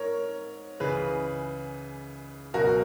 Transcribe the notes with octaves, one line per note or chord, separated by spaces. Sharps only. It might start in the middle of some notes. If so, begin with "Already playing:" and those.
Already playing: G#2 A#4 C#5
C#2 C#3 E3 G#4 B4
C#2 B2 F#3 F#4 A#4